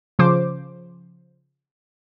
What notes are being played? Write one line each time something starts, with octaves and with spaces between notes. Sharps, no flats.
C#3 F3 C5 D6